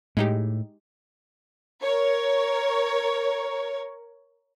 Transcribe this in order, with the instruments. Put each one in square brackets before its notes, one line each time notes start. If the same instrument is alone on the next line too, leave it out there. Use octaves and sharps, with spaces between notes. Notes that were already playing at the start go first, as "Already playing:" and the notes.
[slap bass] A2 [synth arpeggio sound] G#3 D#4 G4
[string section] A#4 C#5